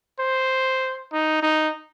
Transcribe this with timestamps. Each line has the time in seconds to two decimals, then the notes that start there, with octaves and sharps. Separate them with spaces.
0.19 C5
1.13 D#4
1.42 D#4